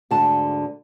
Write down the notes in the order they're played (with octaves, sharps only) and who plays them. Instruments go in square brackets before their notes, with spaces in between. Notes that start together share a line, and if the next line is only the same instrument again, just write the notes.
[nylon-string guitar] D2 G#2 D3 A5